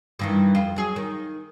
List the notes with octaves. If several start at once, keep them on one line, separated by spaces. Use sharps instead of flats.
G2 D#3 E3
F2 F4
F#3 G#4
D#3